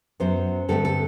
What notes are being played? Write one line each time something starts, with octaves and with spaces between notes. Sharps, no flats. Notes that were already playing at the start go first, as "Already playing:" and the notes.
F#2 F#3 B3 C5
G2 D3 A3 C4 A4
A4